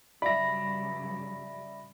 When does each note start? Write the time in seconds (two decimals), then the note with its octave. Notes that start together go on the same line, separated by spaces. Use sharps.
0.22 G2 C#3 F#3 D5 E5 B5 A#6